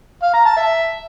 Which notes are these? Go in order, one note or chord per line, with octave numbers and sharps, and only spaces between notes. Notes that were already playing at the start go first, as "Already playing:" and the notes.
F5
A#5
A5
E5